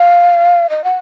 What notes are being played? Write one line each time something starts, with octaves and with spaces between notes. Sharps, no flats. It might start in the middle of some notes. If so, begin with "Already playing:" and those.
Already playing: F5
D#5
F#5